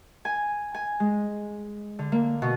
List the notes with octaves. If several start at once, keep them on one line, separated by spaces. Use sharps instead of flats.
G#5
G#5
G#3
D3
A#3
B2